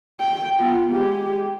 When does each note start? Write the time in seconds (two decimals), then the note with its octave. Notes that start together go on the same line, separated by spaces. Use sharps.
0.20 G5
0.59 B3 F4
0.92 G#3 G4